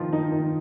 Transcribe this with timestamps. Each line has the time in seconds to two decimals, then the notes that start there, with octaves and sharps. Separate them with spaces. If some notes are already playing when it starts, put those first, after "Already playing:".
Already playing: D#3 F3 D#4 F4
0.13 D#3 D#4
0.31 D#3 D#4